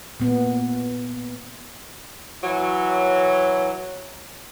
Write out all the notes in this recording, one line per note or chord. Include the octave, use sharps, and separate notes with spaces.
A#2 B3
E3 F#3